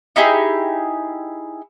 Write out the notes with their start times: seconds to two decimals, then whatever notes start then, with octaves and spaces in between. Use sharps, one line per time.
0.16 D#4 E4 G4 G#4